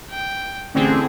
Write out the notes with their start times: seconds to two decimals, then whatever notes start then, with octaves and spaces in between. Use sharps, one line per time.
0.11 G5
0.75 A1 D3 C4 E4 G#4